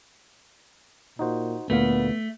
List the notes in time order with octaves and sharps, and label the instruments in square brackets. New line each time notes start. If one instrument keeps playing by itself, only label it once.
[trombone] A#2 [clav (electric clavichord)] D#4 F#4 C5
[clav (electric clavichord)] D2 A#2 F5 [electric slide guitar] A3 [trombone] B3